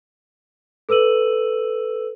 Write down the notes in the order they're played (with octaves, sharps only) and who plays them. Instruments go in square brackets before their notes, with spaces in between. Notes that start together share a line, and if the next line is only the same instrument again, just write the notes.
[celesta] A4 B4 E6 D#7 F#7